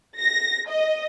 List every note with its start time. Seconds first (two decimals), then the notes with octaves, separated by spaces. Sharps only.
0.18 A#6
0.68 D#5